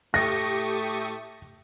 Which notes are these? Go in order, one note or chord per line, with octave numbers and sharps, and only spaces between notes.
A2 A3 G4 C#6 D#6 A#6